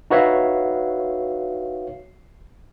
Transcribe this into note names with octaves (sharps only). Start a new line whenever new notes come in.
D#4 F#4 B4 C#5 E5 F5